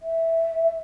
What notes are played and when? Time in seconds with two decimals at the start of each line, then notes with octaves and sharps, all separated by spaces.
0.01 E5